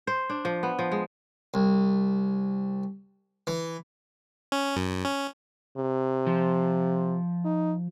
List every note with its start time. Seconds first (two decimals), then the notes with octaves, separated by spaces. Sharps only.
0.07 C5
0.30 D4
0.45 F3
0.63 B3
0.79 F3
0.92 G#3
1.54 C2
3.47 E3
4.52 C#4
4.76 F#2
5.05 C#4
5.77 C3
6.27 F3
7.45 D#4